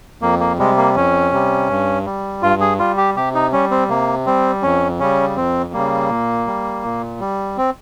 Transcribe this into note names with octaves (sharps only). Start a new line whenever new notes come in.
F2 A#3
A#3
C3 G3 G#3
A#3
F2 C#4
C3 G3
G2
G3
G2 F4
G#4
G3 F4
G4
C3 G4
D#4
G3 C#4
C4
C3 A#3
G3 C4
F2 C#4
C#3 G3 C#4
F2 C4
C#3 G3 A#3
A#2
G3
A#2
G3
C4